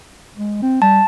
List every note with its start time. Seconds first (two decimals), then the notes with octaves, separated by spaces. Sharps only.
0.36 G#3
0.62 C4
0.82 G3 A5